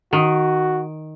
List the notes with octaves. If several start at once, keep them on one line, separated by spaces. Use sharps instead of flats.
D#3 F#4